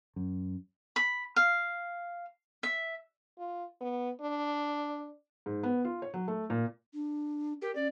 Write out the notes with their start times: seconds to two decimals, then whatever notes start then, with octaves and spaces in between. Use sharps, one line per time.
0.16 F#2
0.96 B5
1.36 F5
2.63 E5
3.38 F4
3.81 B3
4.21 D4
5.46 G#2
5.63 B3
5.85 F4
6.02 C#5
6.14 F#3
6.28 A3
6.50 A#2
6.93 D4
7.62 G4 A#4
7.75 C#4 D5